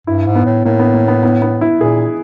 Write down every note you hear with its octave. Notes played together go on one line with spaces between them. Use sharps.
G2 E4
G#2
B3
A2
A2 A#3
B3
A#3
B3
B3
B3
E4
A#2 G#4